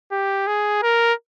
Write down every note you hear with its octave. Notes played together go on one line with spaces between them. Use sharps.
G4
G#4
A#4